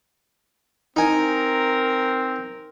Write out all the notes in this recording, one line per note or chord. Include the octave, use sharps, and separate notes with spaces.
C4 D#4 A#4 G#5